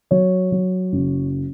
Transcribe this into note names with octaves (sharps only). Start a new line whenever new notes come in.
F#3 C#5
F#3
F#1